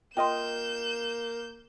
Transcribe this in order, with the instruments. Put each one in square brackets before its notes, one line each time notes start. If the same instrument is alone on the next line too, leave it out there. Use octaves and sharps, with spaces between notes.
[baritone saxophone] A#3 [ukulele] F4 D#5 [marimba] G5 C6 [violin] G6 E7